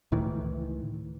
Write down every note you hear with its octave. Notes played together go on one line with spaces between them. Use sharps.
C#2 A2 D#3 E3